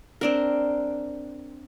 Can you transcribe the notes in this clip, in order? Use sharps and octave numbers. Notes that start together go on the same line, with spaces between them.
C4 D4 A#4